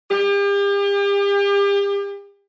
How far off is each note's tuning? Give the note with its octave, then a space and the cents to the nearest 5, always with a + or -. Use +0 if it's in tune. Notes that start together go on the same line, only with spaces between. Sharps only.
G4 +40